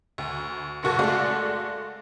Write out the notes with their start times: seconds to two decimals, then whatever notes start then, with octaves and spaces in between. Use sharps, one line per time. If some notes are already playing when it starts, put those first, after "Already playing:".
0.18 D2
0.83 F#1 B1 F#4 A4 C#6
0.99 G#3 A3 F#4 A4 D5 F5